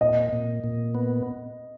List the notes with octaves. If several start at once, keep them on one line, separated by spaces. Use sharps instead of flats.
A#2 D#5
A#2
A#2
B3